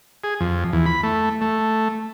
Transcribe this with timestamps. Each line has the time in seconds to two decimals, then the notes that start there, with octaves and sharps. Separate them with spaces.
0.24 G#4
0.40 F2
0.73 E2
0.86 B5
1.03 A3
1.41 A3